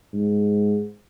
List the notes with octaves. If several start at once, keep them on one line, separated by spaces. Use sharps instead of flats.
G#2